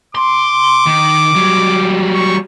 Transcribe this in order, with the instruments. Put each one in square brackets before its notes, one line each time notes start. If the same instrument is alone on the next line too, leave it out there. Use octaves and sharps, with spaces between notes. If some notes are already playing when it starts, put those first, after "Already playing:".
[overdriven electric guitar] C6 [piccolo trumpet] D6
[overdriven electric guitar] D#3
F#3 G3
[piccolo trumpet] C#6